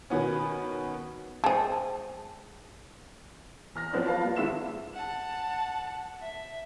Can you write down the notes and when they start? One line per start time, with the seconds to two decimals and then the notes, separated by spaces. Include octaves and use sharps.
0.10 B2 D#3 B3 C#4
1.44 G#3 G#4 C5 G5 A5
3.75 E2 F6 A#6
3.93 F3 F#3 B3 C4 D4
4.07 F4 B4 F5 A5
4.21 G3 A#3 F4
4.36 G#2 D#3 G#3 E5 E6 E7
4.94 F#5 A5
6.22 E5